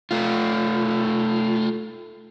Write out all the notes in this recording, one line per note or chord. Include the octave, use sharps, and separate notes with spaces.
A3 F4